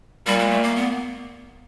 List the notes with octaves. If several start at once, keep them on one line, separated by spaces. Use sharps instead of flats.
A#2 G3
G#3
A3
A#3
B3